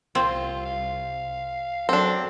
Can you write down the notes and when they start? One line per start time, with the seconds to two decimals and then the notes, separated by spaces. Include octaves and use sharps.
0.15 C2 C4 F4
0.65 F5
1.89 F#3 C4 D4 A4